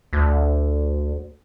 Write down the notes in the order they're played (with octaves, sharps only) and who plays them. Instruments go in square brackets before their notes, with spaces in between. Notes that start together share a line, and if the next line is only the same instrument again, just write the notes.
[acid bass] D2